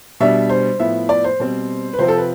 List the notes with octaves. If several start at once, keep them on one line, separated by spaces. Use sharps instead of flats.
B2 G3 D4 E5
C5
A2 F3 B3 E5
D5
C5
B2 G3 C4
B4
C3 F3 C4 C5
A4
B4